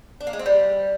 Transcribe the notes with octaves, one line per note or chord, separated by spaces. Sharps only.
D4
A#3
G#3
C4
G3